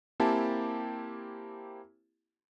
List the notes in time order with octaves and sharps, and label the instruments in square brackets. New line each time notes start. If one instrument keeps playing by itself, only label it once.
[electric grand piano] A#3 C4 E4 G4 G#5 A5